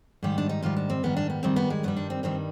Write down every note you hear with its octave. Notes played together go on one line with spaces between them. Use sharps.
G#2 D#3 G3 G4
D4
D#4
G#2 D#3 G3 F4
D4
C4
G#2 D#3 G3 B3
D4
B3
G#2 D#3 G3 C4
B3
G#3
G2 D#3 G3 B3
D4
C4
G2 D#3 G3 C4